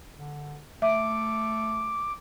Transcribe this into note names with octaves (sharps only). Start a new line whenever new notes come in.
D3
A3 E5 D6